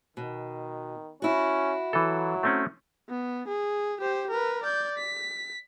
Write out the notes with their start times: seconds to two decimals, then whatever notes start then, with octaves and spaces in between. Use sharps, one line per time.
0.17 B2 D#3
1.22 C#4 E4 F#4
1.93 E3 F#3 A4
2.43 A3 C4 C#4
3.09 B3
3.48 G#4
4.01 G4 C5
4.30 A#4 B4
4.64 D5 G6
4.98 B6